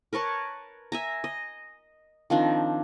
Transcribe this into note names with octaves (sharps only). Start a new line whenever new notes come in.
A#4 B4 C#5 A5
E5 G#5 A#5
D#5
D#3 F3 C4 D4